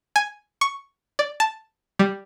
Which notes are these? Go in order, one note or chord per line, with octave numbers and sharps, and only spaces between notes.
G#5
C#6
D5
A5
G3